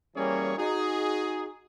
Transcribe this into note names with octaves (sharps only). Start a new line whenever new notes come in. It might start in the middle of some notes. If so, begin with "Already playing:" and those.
E3 G3 A#3 C#4 G#4 C#5
D#4 F#4 G#4